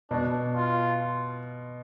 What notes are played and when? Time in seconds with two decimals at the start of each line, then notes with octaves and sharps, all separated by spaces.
0.11 B2 D4
0.56 F4